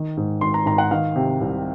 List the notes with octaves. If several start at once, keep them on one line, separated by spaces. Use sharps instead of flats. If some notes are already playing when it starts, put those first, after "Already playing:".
Already playing: D#3
G#2
G#1 C6
A#5
G#1 A#5
F#5
D#3 F5
C3
C2